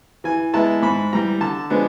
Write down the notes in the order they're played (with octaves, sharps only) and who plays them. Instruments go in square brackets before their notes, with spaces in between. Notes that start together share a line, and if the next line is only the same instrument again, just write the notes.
[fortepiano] E3 G#5
G#3 B3 E4 A5
G#2 B5
E3 G3 A#5
D3 A5
F3 G#3 B3 D4